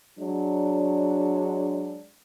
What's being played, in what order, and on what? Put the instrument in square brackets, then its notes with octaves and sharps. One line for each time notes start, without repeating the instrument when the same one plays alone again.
[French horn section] F#3 G#3 D4